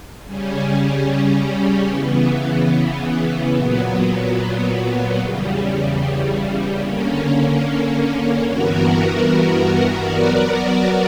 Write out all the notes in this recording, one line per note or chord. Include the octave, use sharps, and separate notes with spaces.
C#3 G3 C#4
C#3 E3 B3
A#2 F#3 B3
E2 C#3 G3
D3 A#3 C#4
G2 E3 B3 F#4 A#4
F#3 B3 F#4 A#4 D5